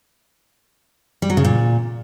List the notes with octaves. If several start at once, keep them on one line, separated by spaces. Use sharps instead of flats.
G3
F#3
C#3
A#2